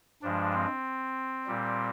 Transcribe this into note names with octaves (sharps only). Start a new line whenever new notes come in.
G2 F3 G#3 D4
C4
A#2 G3